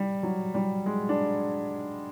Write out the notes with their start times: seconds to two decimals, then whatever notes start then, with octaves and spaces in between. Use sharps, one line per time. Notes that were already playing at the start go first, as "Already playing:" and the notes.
Already playing: G3
0.23 F#3
0.54 G3
0.86 G#3
1.09 D4